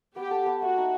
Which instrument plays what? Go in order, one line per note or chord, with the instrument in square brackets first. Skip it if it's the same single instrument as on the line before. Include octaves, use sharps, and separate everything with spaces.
[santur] B3 [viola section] G4
[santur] A4
B3
[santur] A3 [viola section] F#4
[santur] D#4